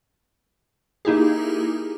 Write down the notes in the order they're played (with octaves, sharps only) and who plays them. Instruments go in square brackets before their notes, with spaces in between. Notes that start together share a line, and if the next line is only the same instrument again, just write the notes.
[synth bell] A#3 D#4 E4 G4 G#4